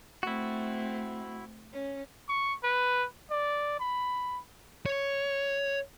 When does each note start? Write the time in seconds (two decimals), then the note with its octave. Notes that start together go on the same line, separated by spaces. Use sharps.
0.23 A3 C4 E4 F#4
1.74 C#4
2.29 C#6
2.64 B4
3.31 D5
3.80 B5
4.86 C#5